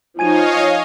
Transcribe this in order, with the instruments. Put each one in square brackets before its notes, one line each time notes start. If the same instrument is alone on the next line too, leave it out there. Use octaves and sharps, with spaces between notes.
[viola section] F3 D#4 [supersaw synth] C#5 D#5 F5 [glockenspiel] G#5 G#6 D#7